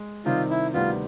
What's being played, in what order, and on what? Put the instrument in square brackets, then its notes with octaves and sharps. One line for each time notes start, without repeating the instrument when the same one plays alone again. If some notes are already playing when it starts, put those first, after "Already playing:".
Already playing: [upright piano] G#3
[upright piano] C3 D#3 G3 C4 D#4 [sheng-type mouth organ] F4
[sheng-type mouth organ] E4
[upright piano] D2 C3 D#3 G3 B3 [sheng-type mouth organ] F4